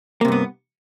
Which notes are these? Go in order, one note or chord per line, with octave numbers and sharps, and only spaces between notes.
G2 C3 A#3 B3